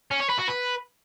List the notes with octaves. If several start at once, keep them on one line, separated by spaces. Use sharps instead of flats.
C#4
C#5
B4
F#4
B4